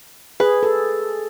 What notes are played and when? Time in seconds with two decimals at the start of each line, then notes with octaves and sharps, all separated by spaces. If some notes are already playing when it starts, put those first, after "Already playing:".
0.40 G#4 B4
0.63 A4